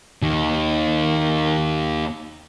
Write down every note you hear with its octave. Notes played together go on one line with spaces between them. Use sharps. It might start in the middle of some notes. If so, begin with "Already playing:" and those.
D#2 D#3